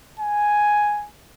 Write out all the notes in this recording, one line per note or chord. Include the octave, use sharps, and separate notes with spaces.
G#5